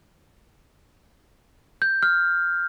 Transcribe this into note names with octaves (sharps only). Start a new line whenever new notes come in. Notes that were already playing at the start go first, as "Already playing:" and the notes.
G6
F6